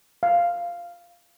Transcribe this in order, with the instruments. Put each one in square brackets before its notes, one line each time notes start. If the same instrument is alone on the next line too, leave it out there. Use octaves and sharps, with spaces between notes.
[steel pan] F5